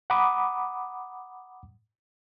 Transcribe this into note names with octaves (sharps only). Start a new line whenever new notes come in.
F#5 A#5 B5 D6 D#6